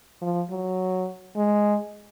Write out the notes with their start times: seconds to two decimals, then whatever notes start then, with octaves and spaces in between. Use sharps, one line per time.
0.22 F3
0.50 F#3
1.36 G#3